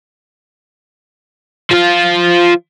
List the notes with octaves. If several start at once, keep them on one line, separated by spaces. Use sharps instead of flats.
F3 F4